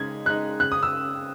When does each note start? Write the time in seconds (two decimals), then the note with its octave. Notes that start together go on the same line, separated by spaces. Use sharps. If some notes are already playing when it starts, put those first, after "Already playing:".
Already playing: C#3 G#3 D#4 G#6
0.26 G#3 D#4 F#6
0.60 C#3 F#6
0.72 D#6
0.83 E6